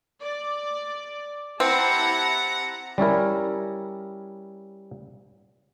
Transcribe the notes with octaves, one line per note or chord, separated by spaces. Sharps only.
D5
C4 E4 G4 F#5 A5 A#5
G3 C#4 E4 A#4